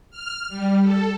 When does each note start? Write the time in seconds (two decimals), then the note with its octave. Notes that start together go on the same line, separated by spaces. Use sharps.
0.10 F6
0.49 G3
0.81 A4